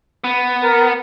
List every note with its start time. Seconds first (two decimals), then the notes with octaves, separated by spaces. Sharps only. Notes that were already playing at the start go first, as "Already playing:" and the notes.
0.24 B3
0.63 A#4